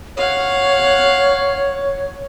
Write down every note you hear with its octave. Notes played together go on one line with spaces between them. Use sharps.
C#5 F5 F#5